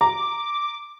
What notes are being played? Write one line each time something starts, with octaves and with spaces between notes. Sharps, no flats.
A#5 D6